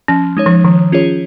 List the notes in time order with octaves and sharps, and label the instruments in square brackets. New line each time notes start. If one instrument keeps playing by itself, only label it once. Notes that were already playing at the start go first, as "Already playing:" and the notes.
[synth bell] F3 [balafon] C#4
[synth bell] G#3 D#4 C#5
[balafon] F3
[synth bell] D#3 [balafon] F3
[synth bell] C#4 F4 G#4 C#5